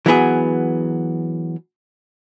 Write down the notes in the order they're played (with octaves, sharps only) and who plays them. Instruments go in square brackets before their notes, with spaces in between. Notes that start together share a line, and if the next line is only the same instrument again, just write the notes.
[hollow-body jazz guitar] E3 F#3 B3 G#4